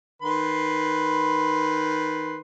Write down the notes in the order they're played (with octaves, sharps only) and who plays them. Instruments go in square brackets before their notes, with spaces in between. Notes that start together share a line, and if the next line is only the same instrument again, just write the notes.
[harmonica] D#3 B4 C6